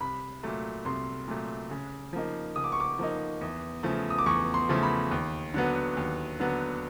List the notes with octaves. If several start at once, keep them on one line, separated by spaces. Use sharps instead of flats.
C2 B5
A#2 F#3 A3
C2 C6
A#2 F#3 A3
C#3
F3 A#3 D#4
C#3 D#6
D6
C#6
D6
F3 A#3 D#4
E2
C#3 F3 A3
D#6
D6
E2 C#6
C6
C#3 F3 A3
B5
D#2
D3 F#3 B3
D#2
D3 F#3 B3